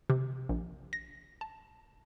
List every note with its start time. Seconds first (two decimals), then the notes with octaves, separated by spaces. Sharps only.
0.10 C3
0.49 A#1
0.93 A#6
1.41 A5